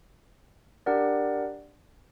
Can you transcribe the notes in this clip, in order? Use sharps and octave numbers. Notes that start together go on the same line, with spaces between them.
D4 G4 A#4 D5 F#5